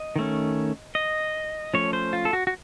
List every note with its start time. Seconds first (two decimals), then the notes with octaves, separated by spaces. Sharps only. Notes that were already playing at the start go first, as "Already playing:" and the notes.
Already playing: D#5
0.16 D#3 A3 C#4
0.95 D#5
1.74 F3 A3 C#4 C#5
1.93 C5
2.13 F4
2.25 A4
2.33 F#4
2.47 F#4